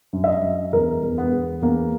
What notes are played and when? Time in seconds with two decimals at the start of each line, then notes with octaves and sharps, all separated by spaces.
0.13 F#2
0.24 E5
0.27 D#5
0.42 F#2
0.73 E2 A#4
1.03 E2
1.18 B3
1.32 E2
1.62 E2 A#3